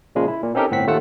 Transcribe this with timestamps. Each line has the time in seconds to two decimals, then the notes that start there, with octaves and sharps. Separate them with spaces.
0.15 A#2 C#3 F3 G#3
0.28 E4
0.43 A#2
0.55 C4 C#4 D#4 G4 A4 A#4
0.71 G1 A2 C4 F#5 B6
0.87 D#2 A3 F4 A4 F#5 E6